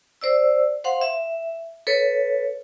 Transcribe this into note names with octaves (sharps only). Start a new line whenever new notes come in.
C5 D5 E6
C5 F5 F#5 C6
E5
A4 B4 C#5